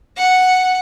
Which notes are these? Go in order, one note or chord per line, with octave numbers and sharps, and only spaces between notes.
F#5